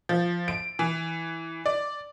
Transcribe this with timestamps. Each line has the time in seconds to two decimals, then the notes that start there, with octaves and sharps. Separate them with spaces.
0.09 F3
0.48 D7
0.79 E3
1.66 D5